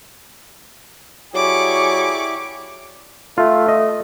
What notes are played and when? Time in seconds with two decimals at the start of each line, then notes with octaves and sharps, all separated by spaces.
1.35 F#3 E4 G4 G#4 D5 C#6 D6
3.38 A3 F4
3.68 D#5